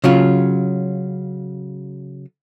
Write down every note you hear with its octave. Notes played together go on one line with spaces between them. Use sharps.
C#3 F#3 F4